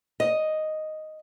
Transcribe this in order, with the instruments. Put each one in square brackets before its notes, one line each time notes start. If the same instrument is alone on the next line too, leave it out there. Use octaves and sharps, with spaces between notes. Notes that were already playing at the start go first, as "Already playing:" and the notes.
[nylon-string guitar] D#5